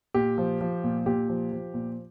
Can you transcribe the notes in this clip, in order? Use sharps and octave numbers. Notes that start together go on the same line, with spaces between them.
A#2 G4
F3
F3
A#2
A#2 G4
F3
F3
A#2